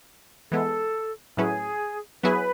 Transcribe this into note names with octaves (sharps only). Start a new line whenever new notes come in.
E3 G#3 B3 A4
A2 F#3 C#4 E4 G#4 B4
F#3 B3 E4 G#4 B4